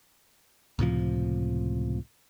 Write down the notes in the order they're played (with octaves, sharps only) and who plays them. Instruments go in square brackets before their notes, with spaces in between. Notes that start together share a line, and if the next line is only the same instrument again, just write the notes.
[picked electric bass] C#2 A2 C3 F3